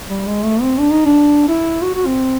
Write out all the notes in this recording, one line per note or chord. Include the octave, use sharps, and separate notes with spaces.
G3
G#3
A3
C4
D4
D#4
D4
E4
F#4
F#4
C4